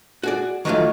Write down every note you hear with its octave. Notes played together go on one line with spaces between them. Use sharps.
F#4 G#4 D5
D#3 E3 F#3 A3 F4